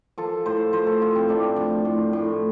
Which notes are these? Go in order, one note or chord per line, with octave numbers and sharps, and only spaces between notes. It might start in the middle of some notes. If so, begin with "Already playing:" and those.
F3 A4
A2 C5
F3 C5
A4
F3 F4
C4
A2 D4
F3
A2
A2